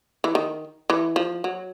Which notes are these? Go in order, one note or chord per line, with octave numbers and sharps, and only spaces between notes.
E3
D#3
E3
F3
F#3